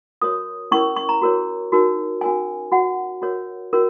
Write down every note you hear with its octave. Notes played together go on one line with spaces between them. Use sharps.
F#4 A#4 C#5 D#6
C#4 E4 A#4 C#5 C#6
C#6
A#5
F#4 A#4 C#5
D#4 F#4 A#4 C#5
C#4 F#4 A#4 C#5 G#5
F#4 C#5 F#5
F#4 A#4 C#5
C#4 F#4 A#4 C#5